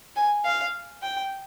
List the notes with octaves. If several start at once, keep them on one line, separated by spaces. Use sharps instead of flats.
G#5
F5
G5